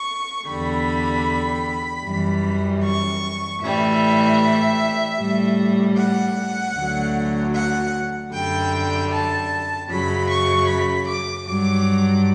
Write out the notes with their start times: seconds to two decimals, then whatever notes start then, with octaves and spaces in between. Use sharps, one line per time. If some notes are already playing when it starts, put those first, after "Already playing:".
Already playing: C#6
0.47 E2 D3 G3 B5
2.05 F#2 E3 G3
2.84 C#6
3.62 A2 E3 G3 E5
5.19 A2 G3
5.97 F#5
6.76 D2 D3 F#3
7.55 F#5
8.33 F#2 D3 G3 G5
9.12 A5
9.90 F#2 C#3 F#3 B5
10.30 C#6
10.68 B5
11.08 D6
11.47 G2 F#3 D6